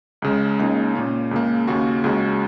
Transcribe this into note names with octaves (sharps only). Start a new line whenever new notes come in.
C#2 C#3 G#3
C#2 C#3 A#3 D#4
A#2 A#3 C#4
C#2 C#3 A#3
D#2 C#3 A#3 F#4
C#2 C#3 G#3 F#4